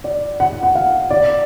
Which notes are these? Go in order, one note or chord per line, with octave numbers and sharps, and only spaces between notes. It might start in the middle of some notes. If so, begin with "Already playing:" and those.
D5
F#5
F#5
F5
D5